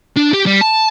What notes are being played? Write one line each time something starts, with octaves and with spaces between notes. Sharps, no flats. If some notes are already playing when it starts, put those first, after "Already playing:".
D4
G4
G3
A5